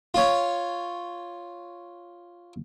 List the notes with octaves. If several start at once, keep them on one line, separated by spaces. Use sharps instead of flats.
F4 C#5